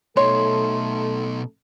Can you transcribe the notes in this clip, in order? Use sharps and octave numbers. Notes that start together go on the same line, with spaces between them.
B2 A3 D#4 A4 C#5 C6